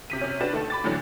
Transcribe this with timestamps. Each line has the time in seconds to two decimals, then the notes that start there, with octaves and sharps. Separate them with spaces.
0.10 C3 B6 D#7
0.21 C3 C#4
0.41 D4 F#4 B4 E7
0.53 D#3 A3 A4
0.70 B5 D6 A6
0.84 A2 D3 E3 F#3